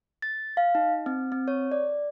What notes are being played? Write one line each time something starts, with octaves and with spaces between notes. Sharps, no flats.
A6
F5
D#4
C4
C4
C#5
D5